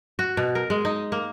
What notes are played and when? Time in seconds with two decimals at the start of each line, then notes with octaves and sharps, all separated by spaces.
0.19 F#4
0.37 B2
0.55 A#4
0.70 G#3
0.85 D#4
1.12 A#3